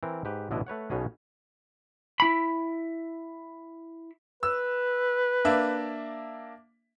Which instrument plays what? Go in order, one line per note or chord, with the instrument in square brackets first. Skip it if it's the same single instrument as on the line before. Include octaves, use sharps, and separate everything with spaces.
[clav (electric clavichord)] E3 C4 A#4
G#2 G4 B4
A1 B2 D3 E4 D5 D#5
A3 B4 C#5 F#5
B1 B2 C#4 G#4 D#5
[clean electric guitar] E4 B5
[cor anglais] B4 [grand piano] E6
[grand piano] A#3 D4 E5